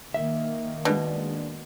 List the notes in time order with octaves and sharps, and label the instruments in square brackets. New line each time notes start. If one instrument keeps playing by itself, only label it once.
[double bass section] D#3 A#3 [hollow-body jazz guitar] E5
[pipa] B2 [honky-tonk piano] G#3 D4